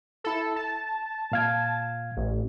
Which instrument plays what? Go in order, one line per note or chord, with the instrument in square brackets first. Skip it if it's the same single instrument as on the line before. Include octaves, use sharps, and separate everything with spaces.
[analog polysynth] E4 A4
A5
[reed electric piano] A#2 F5 G#6
[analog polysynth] A1